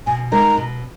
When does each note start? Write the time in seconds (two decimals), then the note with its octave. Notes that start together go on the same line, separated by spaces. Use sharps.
0.07 B2 G#5
0.32 G#3 D#4 A#4 A#5
0.57 B2